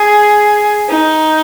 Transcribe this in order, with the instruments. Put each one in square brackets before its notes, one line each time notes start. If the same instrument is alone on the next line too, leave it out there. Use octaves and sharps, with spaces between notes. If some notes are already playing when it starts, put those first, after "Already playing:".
Already playing: [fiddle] G#4
D#4